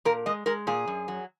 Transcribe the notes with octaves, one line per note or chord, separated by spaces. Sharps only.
A#2 A#4
G#3 D#5
G#3 A#4
A#2 G#4
F#2
F#3